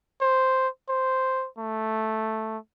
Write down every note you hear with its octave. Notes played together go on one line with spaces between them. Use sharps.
C5
C5
A3